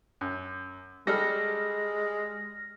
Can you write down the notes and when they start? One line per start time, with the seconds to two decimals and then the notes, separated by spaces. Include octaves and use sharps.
0.21 F#2
1.07 G3 G#3 D4 A4 F6 A#6